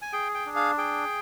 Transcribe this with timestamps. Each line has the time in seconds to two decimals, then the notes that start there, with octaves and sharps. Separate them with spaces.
0.02 G#5
0.13 G#4 G5
0.35 G5
0.46 D4
0.56 F5
0.78 G#4 G5